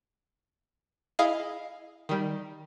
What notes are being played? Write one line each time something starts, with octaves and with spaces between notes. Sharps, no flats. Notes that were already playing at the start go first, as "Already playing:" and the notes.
E4 G#4 D#5 F5
D#3 G3